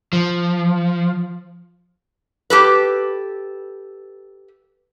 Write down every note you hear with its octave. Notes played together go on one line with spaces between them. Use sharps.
F3
G4 A4 B4